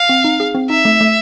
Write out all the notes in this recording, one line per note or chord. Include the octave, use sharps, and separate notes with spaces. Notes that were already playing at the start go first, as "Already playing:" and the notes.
Already playing: F5
C4
D#4
G#4
C4
D#4 E5
A3
A3